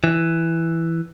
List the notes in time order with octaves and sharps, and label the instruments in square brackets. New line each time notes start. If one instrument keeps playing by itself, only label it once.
[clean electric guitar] E3